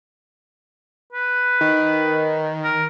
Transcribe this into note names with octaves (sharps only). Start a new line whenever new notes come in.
B4
D#3
A#4